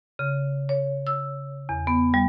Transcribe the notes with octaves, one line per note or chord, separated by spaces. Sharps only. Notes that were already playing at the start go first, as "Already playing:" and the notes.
C#3
C#5
E6
E2
B3
G3